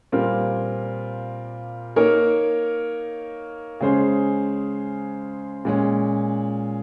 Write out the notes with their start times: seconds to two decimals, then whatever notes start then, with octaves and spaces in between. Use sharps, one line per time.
0.12 A#2 G3 C4 F4 A#4
1.96 A#3 D#4 A#4 C#5
3.80 C#3 G#3 C#4 G#4 C5
5.65 A#2 G#3 C#4